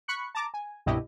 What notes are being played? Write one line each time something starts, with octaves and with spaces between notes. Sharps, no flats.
B5 C#6 F#6 C#7
A5 A#5 D6
G#5
C2 G2 B2 E4 G4 D#5